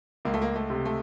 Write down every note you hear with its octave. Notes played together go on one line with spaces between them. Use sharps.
C#2 A#3
A3
A#3
A3
C3
A3